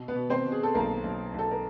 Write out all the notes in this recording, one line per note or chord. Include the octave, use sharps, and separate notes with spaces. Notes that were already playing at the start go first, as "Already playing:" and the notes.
Already playing: B2
B3 B4
B2
C4 C5
B2
G#4
A4
B1 A#3 A#4
B1
B1 A4
A#4